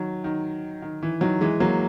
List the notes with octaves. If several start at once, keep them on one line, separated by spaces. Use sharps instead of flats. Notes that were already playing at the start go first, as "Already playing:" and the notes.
Already playing: D#3 F#3
D#3
D#3
E3
D#3 F#3
E3 G#3
F#3 A#3